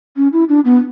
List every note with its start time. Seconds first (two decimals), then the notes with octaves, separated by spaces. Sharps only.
0.16 C#4
0.33 E4
0.49 D4
0.65 B3